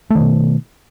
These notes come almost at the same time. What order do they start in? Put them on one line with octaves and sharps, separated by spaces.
A3 D#3 B2